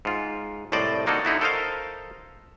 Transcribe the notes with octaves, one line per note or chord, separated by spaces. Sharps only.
G#2 F4
C2 A2 C5 D5 D#5
D3 A#3 D#4 F#4 A4
D3 D#4 E4 F#4
A4 A#4 C5 D#5 F5